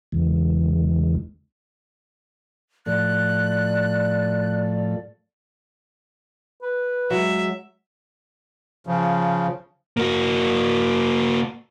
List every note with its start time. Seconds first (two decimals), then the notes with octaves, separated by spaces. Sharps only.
0.12 E2 C#3 E3 G#3
2.86 A2 F3 A3 D5 F#6
6.62 B4
7.11 F#3 G#3 E5
8.87 C#3 F3
9.97 A#3 F#4